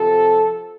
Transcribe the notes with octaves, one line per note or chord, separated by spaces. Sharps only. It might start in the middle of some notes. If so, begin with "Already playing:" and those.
Already playing: C3 F3 A4